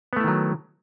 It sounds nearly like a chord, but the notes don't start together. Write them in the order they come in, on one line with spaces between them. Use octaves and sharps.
B3 A3 E4 D#3 F#3